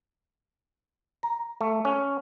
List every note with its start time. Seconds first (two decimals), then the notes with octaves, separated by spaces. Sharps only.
1.23 A#5
1.61 A3
1.85 C#4